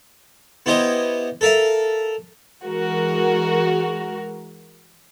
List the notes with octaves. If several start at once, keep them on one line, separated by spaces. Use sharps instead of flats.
B3 E4 G4 C5 D#5 G#5
A4 A#4 E5 F5
E3 G#3 F#4 A#4